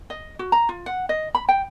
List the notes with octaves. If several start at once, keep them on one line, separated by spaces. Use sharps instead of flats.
D#5
F#4
A#5
F4
F#5
D#5
B5
G5